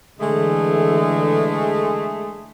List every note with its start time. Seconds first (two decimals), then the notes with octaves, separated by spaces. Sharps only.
0.20 D3 E3 G#3 A3